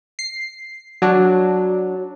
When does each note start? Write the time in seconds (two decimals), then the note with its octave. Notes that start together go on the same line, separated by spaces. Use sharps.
0.19 C7
1.02 F#3 D4